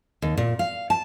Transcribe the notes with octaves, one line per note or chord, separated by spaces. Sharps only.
D#2
A#2
F5
A5